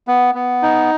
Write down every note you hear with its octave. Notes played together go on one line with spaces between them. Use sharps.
B3
B3
D#4